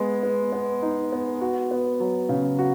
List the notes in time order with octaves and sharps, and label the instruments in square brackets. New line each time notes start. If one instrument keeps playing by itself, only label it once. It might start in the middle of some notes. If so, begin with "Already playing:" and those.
Already playing: [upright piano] G#3 B3
B3
B3
D#4
B3
F#4
B3
F#3
C#3
F#4